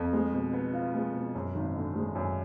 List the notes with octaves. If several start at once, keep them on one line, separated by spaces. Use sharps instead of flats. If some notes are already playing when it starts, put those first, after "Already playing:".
Already playing: F2
G#3
B2
B3
F4
G#3
B2
F#2
G#1
D3
G#3
F#2